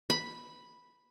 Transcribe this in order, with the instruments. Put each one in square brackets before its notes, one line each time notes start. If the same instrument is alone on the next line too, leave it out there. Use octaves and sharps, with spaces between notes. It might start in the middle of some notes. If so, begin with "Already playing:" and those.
[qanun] B5